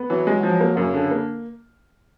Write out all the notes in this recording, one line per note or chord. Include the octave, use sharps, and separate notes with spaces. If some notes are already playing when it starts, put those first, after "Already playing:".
Already playing: B3
E3 F#3
G#3
F3 F#3
A#3
F#2 C#3
D3
A#3